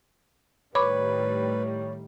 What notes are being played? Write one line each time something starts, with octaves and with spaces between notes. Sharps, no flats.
A2 D#3 G3 B4 C#5 B5 D6